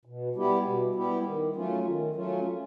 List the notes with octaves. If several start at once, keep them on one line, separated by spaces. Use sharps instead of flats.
B2
G3 B3 E4 G4
B2
G3 B3 E4 G4
D#3
F#3 A3 C#4 F4
D#3
F#3 A3 C#4 F4